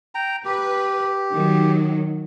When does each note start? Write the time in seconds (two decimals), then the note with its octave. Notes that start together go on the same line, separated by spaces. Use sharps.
0.15 G5 A#5
0.45 G4 B4
1.33 D#3 F#3